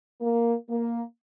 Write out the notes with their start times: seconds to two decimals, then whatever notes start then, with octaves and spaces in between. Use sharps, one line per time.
0.21 A#3
0.70 A#3